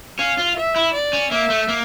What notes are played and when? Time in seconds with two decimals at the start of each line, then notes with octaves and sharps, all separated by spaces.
0.19 C#4 F5
0.38 F4
0.57 E5
0.76 E4
0.94 D5
1.13 C#4
1.31 A#3 E5
1.50 A3
1.69 A#3